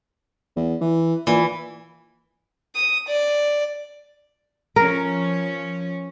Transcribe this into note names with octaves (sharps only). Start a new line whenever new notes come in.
E2
E3
A#2 E3
D#6
D5
F3 C#4 A#4